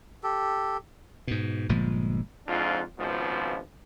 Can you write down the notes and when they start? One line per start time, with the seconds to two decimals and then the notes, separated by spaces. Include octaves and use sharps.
0.23 G4 A4
1.27 G#2 B2
1.69 G1 A#2 F3 G#3
2.47 F2 G#2 D4 F4
2.98 G#1 C#2 B2 F3